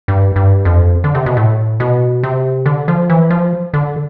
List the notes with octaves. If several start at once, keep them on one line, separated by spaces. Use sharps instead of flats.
G2
G2
F2
D3
C3
B2
A2
B2
C3
D3
F3
E3
F3
D3